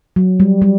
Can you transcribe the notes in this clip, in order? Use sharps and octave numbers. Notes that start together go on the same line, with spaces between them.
F#3
G3
G3